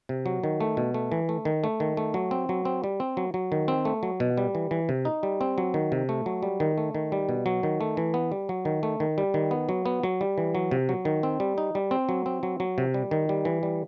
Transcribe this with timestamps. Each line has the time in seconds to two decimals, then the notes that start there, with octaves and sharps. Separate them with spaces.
0.09 C3
0.26 F#3
0.44 D#3
0.61 A3
0.77 B2
0.94 A3
1.12 E3
1.29 A3
1.45 D#3
1.64 A3
1.80 D#3
1.97 A3
2.14 F#3
2.31 C4
2.49 F#3
2.65 C4
2.84 G3
3.00 C4
3.17 F#3
3.34 F#3
3.52 D#3
3.68 C4
3.85 A3
4.03 F#3
4.20 B2
4.38 G3
4.55 E3
4.71 E3
4.89 C3
5.05 D#4
5.23 G3
5.41 C4
5.58 F#3
5.74 D#3
5.92 C3
6.09 A3
6.26 F#3
6.43 G3
6.60 D#3
6.78 A3
6.95 D#3
7.12 G3
7.29 B2
7.46 F#3
7.63 D#3
7.81 A3
7.97 E3
8.14 B3
8.32 G3
8.49 F#3
8.65 D#3
8.83 A3
9.00 D#3
9.18 G3
9.34 D#3
9.51 B3
9.69 F#3
9.86 B3
10.03 F#3
10.21 G3
10.38 E3
10.55 F#3
10.71 C3
10.89 F#3
11.05 D#3
11.23 C4
11.40 G3
11.58 D#4
11.75 G3
11.91 C4
12.09 F#3
12.26 C4
12.43 F#3
12.60 F#3
12.78 C3
12.94 G3
13.11 D#3
13.29 G3
13.45 E3
13.63 G3